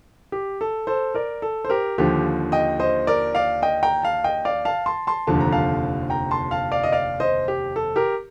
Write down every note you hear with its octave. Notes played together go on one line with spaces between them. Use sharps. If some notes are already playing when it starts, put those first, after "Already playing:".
G4
A4
A4 C5
A#4 D5
A4
C5
G4 A#4
D#2 D3 F3 G4
D#5 G5
C5 D#5
A#4 D5
D5 F5
D#5 G5
G5 A#5
F5 A5
D#5 G5
D5 F5
F5 A5
A5 C6
A5 C6
F1 D#2 D3 F3 A5
A#5
F5 A5
G5 A#5
A5 C6
F5 A5
D5 F5
D#5
D5 F5
C5 D#5
G4
A4
G4 A#4